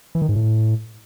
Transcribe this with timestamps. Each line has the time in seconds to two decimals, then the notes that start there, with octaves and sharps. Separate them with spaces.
0.15 E3
0.22 D#3
0.29 G#2
0.36 A2